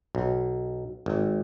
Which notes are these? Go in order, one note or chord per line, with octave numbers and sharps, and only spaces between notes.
B1
G#1